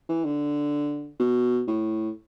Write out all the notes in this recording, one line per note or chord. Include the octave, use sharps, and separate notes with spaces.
E3
D3
B2
A2